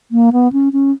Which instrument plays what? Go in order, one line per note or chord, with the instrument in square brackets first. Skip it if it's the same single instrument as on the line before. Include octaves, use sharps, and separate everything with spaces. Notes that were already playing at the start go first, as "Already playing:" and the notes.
[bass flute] A#3
B3
C#4
C#4